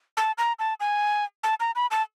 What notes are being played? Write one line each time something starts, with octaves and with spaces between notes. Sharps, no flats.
A5
A#5
A5
G#5
A5
A#5
B5
A5